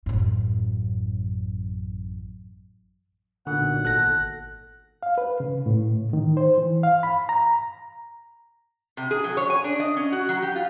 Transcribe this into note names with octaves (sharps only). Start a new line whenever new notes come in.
A1 F#2
B1 A#2 D3 F#5
G#1 A4 F#6 A#6
F5
B4
C#3
A2
D#3
C5
E3
F5
B5
A#5
C3
G#4
F#3
C#5
G#5
D4
D#5
C#4
F#4
F#3
G4
F4